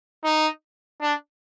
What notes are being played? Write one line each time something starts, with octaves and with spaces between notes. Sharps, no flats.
D#4
D4